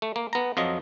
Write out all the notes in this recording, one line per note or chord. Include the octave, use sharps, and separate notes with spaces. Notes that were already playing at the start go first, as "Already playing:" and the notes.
A3
A#3
B3 A#5
F2 F3 F#3 D#5